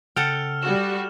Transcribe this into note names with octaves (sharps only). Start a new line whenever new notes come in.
C#3 A4 F#5 G5 F6 F7
G3 F#4 E7